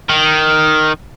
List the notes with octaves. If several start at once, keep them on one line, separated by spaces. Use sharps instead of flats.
D#3